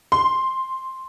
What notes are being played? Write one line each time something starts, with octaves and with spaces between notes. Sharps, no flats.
C6